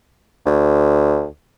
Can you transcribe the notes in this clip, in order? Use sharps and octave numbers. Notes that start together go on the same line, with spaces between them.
D2